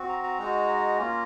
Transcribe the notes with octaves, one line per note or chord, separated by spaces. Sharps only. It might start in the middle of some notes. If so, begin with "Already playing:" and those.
Already playing: C4 F#4
A#5
A#5
G#3 D#4 F#4
A#3 C#4 F4